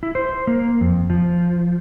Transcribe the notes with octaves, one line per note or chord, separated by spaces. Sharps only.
E4
C5
A#3
F2
F3